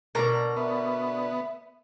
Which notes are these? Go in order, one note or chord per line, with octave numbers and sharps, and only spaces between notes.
B2 D3 A#4 D5 A#5
B3 E5